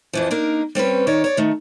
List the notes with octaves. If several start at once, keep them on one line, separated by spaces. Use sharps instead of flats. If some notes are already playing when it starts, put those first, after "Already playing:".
F2 E3 F3
A#3 D4 D#4 A#4
G3 C4 C#4 B4
D#3 C#5 D5
C#5 D5
D#3 A3